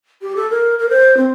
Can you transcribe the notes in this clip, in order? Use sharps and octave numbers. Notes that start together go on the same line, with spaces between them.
G4
A4
A#4
A#4
C5
C4